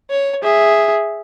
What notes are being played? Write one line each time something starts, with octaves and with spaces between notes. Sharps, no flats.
C#5
G#4 E5